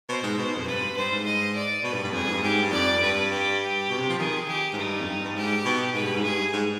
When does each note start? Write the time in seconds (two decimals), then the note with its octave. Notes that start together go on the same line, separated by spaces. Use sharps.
0.09 B2 C5
0.23 G#2
0.38 B2
0.57 F2
0.67 G2 B4
0.96 G2 C5
1.12 G#2
1.26 D#5
1.55 D5
1.84 B2 B4
1.94 G2
2.04 G2
2.13 F2 G#4
2.24 F2
2.29 G#2
2.34 G2
2.43 G#2 G4
2.62 G2
2.72 F2 D5
3.02 G2 B4
3.31 G4
3.89 B2
3.99 C3
4.10 F3
4.19 D#3 G#4
4.48 G4
4.73 G#2
4.78 G2 D#4
5.01 F2
5.07 G2
5.25 G2
5.36 G#2 G4
5.65 B2
5.94 G#2 B4
6.04 G2
6.14 G#2
6.24 G2 G#4
6.54 G#2